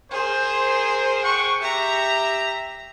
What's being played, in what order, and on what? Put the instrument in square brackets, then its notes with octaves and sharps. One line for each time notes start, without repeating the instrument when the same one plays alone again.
[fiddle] G#4 [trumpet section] A#4 C5
[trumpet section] F#5 G5 C#6
[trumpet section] G4 E5 [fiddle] A#5